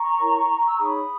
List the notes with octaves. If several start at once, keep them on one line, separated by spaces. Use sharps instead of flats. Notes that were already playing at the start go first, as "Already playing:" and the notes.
Already playing: A#5 C#6
E4 A#4 C#5
E6
D#4 G#4 C#5 B5 D#6